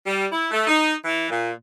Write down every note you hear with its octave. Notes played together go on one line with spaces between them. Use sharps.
G3
E4
A3
D#4
E3
A#2